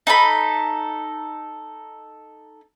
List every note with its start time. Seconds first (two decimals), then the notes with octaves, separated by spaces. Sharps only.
0.07 D#4 A4 B5